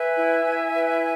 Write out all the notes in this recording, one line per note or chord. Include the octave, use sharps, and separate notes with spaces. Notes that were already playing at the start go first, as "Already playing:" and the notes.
Already playing: B4 E5 G#5
E4
E4
B4